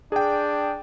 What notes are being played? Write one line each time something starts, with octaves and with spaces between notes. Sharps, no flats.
D4 G#4 G5